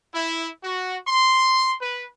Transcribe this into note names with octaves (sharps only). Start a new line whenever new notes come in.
E4
F#4
C6
B4